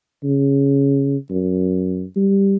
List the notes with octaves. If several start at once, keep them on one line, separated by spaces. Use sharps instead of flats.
C#3
F#2
G3